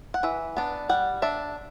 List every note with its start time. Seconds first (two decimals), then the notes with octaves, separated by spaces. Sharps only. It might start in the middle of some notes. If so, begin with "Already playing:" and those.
0.14 F#5
0.23 E3 E5
0.57 B3 D4
0.89 G3 F#5
1.22 D4 E5